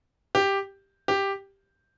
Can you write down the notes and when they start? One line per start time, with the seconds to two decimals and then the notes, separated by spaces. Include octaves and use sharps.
0.35 G4
1.08 G4